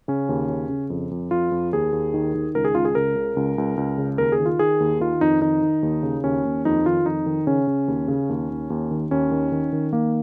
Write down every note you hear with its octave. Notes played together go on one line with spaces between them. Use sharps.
C#3 C#4
D#2
C#3
C#3
F2
F2
F2 F4
F2
D#2 G#4
D#2
D#3
D#3
C#2 A#4
G#4
C#2 F4
G#4
C#2 A#4
C#3
C#2
C#2
C#2
C#3
D#2 A#4
G#4
D#3
F4
D#3 G#4
D#2
D#3 F4
F2 D#4
D#3 D#4
D#3
D#2
C#3
D#2 C#4
D#2
F2 D#4
D#3 F4
F2 D#4
D#3
C#3 C#4
C#3
D#2
C#3
D#2
D#2
D#2
D#3
D#2 C#4
D#3
D#3
D#3
D#3 A#3